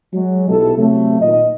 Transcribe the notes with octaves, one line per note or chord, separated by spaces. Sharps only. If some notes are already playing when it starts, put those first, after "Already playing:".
F#3 G#3
B1 B2 E4 G4 A4
C3 F#3 A3
A#2 D#3 D#5